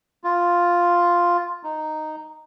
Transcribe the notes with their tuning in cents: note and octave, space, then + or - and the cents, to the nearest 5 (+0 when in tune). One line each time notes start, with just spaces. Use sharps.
F4 +0
D#4 -5